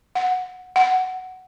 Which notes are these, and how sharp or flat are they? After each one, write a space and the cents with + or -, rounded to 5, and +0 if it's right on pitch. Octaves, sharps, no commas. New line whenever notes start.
F#5 -10
F#5 +10